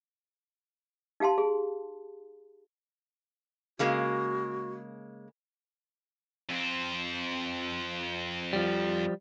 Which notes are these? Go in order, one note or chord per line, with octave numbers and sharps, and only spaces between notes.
D#4 G4 F5 A5 C6
G#4
C#3 G#3 A#3 F#4
F2 C4
F3 G3